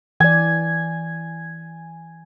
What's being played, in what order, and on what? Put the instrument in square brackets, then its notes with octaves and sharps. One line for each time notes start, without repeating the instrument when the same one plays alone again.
[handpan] E3 D5 [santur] G#5